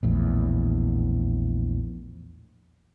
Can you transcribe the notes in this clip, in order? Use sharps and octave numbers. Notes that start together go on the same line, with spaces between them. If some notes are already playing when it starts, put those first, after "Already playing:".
A#1 E2 A2